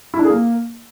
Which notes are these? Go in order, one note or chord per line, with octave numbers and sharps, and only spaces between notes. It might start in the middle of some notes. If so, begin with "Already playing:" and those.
E4
D4
G#4
A#3